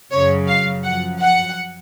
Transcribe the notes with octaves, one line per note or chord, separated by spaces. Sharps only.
F#2 C#3 F#3 C#5
F5
F#2 F3 F#5
F#5